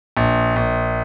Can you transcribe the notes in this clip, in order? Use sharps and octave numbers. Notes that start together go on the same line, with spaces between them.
A#1
A#1